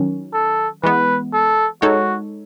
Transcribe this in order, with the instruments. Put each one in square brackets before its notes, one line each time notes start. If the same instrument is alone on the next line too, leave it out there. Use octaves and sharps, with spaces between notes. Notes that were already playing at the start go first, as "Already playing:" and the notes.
Already playing: [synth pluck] D#3 F#3 C#4
[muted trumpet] A4
[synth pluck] E3 G#3 B3 [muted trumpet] B4
[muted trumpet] A4
[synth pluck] G#3 D#4 A4 C#5 [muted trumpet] F#4